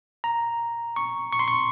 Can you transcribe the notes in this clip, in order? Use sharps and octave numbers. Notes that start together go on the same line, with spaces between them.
A#5
C#6
C#6
C6
C#6